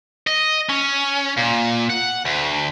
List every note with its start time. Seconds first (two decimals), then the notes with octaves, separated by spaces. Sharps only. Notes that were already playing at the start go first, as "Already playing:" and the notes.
0.27 D#5
0.70 C#4
1.37 A#2
1.89 F#5
2.25 D2